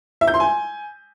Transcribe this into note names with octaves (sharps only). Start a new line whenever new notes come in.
E5
G6
C6
G#5